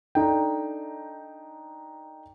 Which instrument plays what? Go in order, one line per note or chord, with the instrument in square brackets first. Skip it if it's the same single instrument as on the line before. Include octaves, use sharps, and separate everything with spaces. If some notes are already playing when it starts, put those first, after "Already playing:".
[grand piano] D4 D#4 A4 G5